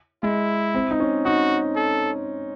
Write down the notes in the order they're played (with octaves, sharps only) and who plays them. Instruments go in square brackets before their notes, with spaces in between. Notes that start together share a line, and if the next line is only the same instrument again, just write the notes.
[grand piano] G#3 [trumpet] E4
[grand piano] C4
D#4
C#4
[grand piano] D#4 [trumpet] F#4
[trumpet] A4